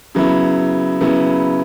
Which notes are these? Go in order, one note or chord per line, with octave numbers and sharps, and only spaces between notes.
C#3 F#3 B3 E4
C#3 F#3 B3 E4